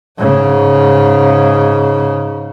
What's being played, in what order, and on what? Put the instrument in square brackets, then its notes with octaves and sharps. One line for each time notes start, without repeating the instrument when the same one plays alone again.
[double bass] G#2 C#3